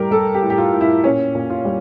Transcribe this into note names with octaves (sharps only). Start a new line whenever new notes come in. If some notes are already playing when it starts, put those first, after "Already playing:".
Already playing: A2 G3 G4 A#4
G3 A4
G4
A2
G4
F4
A2
E4
A#2 C#4
A#2
F4
G3